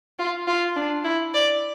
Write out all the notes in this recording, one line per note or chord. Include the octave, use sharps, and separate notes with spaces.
F4
F4
D4
E4
D5